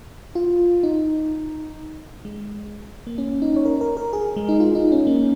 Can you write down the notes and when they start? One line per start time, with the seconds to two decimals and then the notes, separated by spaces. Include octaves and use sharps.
0.35 F4
0.83 D#4
2.25 G#3
3.07 A#3
3.18 C#4
3.42 D#4
3.56 C#5
3.65 A#4
3.81 A#4
3.97 A#4
4.13 G#4
4.37 G#3
4.49 D#4
4.60 F4
4.75 D#4
4.92 C#4
5.07 A#3